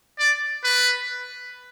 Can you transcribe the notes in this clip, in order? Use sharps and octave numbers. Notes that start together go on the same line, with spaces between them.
D5
B4